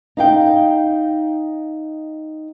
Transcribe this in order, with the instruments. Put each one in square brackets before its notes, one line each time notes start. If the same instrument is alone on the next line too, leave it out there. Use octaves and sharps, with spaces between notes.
[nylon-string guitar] D#4 F5 G5